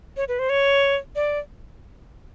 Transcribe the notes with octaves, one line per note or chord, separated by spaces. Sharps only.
C#5
B4
C5
C#5
D5